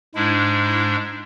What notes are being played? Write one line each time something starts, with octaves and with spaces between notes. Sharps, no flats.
G#2 G#3 D4 E4
E4